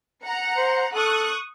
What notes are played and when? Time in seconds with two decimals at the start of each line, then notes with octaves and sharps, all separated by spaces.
0.24 F#5 A#5 C#7
0.57 C5
0.95 A4 C#6 D#6 F#6